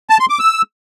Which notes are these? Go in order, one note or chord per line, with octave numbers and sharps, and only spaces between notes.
A5
C6
D6
E6